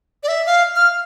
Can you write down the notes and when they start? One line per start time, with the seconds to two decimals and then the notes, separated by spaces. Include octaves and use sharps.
0.23 D5
0.28 E5
0.46 F5
0.76 F6